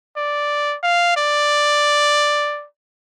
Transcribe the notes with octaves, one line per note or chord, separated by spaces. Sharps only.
D5
F5
D5